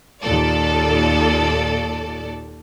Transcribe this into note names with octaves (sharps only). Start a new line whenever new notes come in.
D#2 A#2 A4 D5